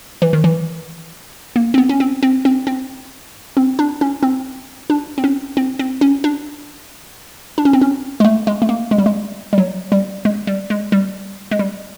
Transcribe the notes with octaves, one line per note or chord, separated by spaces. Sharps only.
E3
D#3
E3
A#3
C4
B3
C#4
C4
C4
C4
C4
C4
D4
C#4
C4
D4
C4
C#4
C4
C4
C#4
D4
D4
C#4
C4
C#4
G#3
A3
G#3
A3
A#3
G#3
G3
G#3
G3
F#3
G3
G#3
G3
G#3
G3
G#3
G3